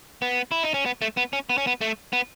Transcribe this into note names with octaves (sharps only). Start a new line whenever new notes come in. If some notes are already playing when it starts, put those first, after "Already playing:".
B3
E4
D#4
C#4
B3
A3
B3
C#4
B3
C#4
B3
A3
B3